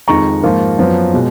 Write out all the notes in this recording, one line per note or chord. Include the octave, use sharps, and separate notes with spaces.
F2 D#3 G#3 D#4 A#5 C#6
G#2 F3 A#3 F4
F#2 F3 B3
B2 G#3